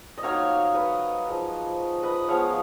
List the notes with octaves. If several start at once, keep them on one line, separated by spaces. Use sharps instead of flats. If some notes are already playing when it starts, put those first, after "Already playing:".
D#5
F#3 A#3 D#4 C#5 F5
B4 D#5
F3 G#3 D#4
B4 D#5
F3 G#3 B3 C#5 F5